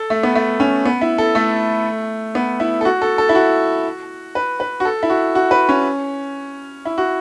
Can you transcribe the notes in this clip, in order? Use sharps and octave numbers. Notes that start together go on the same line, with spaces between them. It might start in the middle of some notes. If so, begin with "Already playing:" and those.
Already playing: A4
A3
B3
A3
C#4
B3
E4
A4
A3
B3
E4
A4
F#4
A4
A4
E4
F#4
B4
B4
F#4
A4
E4
F#4
F#4
B4
C#4
E4
F#4